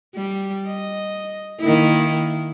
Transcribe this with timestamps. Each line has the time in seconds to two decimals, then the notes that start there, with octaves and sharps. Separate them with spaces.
0.15 G3
0.67 D#5
1.60 D#3 A#3 E4